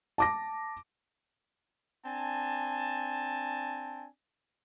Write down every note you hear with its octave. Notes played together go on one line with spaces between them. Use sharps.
A5 D6 A#6
C4 D4 G#5 A5